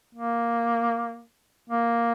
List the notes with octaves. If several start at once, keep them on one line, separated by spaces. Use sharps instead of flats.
A#3
A#3